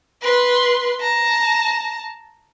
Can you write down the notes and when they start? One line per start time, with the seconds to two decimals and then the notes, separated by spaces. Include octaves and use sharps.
0.22 B4 C6
1.01 A5 A#5